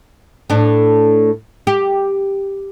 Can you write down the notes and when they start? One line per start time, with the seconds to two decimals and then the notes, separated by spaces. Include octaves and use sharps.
0.50 A2 D4
1.67 G4